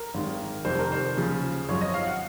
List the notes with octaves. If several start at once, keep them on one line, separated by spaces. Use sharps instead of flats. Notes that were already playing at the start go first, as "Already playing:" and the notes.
Already playing: A#4
G#1 G#2 D#3
F1 F2 D#3 C5
A#4
C5
D#2 C#3 F3
G#1 F#2 F3 C#5
D#5
F5
F#5